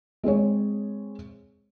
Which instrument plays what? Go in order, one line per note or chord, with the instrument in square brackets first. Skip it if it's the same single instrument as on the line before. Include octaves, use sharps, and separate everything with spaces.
[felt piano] G#3 C4 G#4 C#5